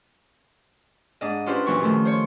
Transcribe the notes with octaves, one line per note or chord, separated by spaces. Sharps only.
G#2 D4 D#5
C#4 D4 F4 G4 B4 C5
F#2 A#2 E3 F#3 F4 C#6
D#3 F3 A3
C5 C#5